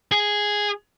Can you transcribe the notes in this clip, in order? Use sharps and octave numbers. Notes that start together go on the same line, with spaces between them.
G#4